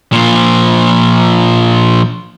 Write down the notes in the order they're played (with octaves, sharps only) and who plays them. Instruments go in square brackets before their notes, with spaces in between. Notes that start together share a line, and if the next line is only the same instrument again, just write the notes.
[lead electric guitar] A#2 F3